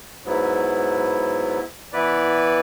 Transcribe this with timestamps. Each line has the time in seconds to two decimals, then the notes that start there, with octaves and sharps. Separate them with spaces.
0.24 G#2 F#3 B3 E4
1.93 E3 B3 E4 B4 D5